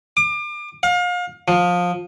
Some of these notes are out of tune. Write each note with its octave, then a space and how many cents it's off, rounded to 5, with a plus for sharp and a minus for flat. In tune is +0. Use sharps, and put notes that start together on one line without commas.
D6 +35
F5 +35
F3 +20